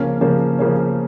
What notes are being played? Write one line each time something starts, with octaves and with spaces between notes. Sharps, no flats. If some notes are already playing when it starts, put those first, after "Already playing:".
Already playing: C#3 F3 A#3 C#4
C#3 F3 A#3 C#4
C#3 F3 A#3 C#4